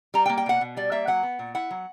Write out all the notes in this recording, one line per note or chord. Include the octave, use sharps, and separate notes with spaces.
G3 A#5
G5
A#3
G5
B2 F#5
B2
G3 D5
A#3 E5
F#3 F#5
B3
A#2
E4 F#5
F#3